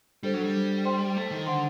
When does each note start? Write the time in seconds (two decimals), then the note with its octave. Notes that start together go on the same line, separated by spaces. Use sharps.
0.23 G3 D4 A4 C5
0.34 F#3
0.44 G3
0.85 C5 G5 C6
1.17 A3
1.31 D#3
1.46 D3 C5 F#5 C6